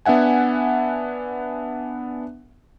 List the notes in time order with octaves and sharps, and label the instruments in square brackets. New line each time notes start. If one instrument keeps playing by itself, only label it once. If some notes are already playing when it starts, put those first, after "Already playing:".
[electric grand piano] B3 D4 E5 F#5 G#5